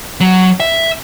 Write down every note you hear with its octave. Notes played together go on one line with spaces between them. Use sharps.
F#3
E5